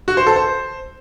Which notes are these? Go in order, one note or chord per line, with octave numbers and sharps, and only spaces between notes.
F#4
C5
A4
C5